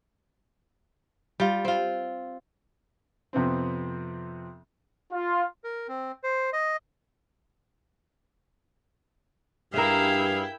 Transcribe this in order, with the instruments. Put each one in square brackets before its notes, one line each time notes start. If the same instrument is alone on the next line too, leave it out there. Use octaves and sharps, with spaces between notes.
[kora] G3 F4
C4 F4
[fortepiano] F2 C3 B3 C4
[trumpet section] F4
[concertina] A#4
C4
C5
D#5
[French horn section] G2 [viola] E4 G5 [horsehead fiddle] G#4 F5 [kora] A#4 E5